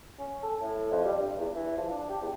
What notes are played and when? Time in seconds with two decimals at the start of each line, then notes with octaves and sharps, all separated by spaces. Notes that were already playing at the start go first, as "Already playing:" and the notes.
0.19 C#4
0.43 A4
0.62 A2
0.92 F2
1.05 G3
1.18 G2
1.39 E2
1.55 E3
1.77 F3
1.90 D4
2.09 G4
2.22 E2